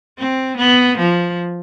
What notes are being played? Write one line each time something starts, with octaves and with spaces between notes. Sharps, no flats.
C4
B3
F3